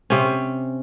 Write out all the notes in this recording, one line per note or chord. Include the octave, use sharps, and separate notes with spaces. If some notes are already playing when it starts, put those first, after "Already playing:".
C3 C#4